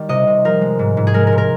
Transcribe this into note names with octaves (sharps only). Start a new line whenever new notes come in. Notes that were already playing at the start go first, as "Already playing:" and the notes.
Already playing: D#3 G3
C3 D#5
C3
F3 A#4
G#3
G#2
G#2
G#4
G#3 A#4
A#4
A#2
A#4